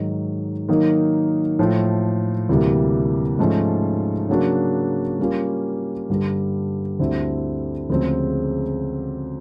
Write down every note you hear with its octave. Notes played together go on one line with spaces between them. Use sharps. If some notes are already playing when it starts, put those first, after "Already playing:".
Already playing: G#2 D#3 F#3
D#3 F#3 A#3 D#4
A2 F3 A3
D2 C3 E3 G3 A#3
G#2 F3 A3 C#4
C#3 F#3 A#3 D4 F#4
G3 A#3 C#4 F4
G2 D3 G3
D2 D3 G3 C4 E4
D2 C#3 F3 G#3 C4